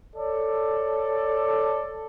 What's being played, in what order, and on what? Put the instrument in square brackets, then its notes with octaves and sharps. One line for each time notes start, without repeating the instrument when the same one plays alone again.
[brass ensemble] A4 C#5 D5